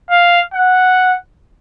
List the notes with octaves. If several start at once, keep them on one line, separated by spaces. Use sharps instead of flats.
F5
F#5